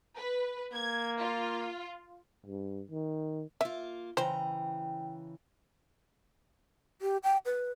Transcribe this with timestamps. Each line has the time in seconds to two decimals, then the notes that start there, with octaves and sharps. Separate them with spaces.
0.17 B4
0.73 A#3 G#6
1.18 F4
2.46 G2
2.91 D#3
3.61 A#3 F4 E5
4.17 C#3 E3 C5 G5 A#5
7.02 G4
7.23 G5
7.46 B4